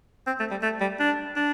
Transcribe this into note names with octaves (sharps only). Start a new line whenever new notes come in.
C4
A3
G3
A3
G3
D4
D4